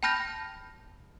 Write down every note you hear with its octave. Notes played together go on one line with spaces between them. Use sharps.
G5 A5 B5 F6 G6 A#6